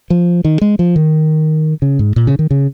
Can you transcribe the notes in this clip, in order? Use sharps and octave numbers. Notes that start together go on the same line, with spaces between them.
F3
D#3
G#3
F3
D#3
C#3
G#2
A#2
C#3
D#3
C#3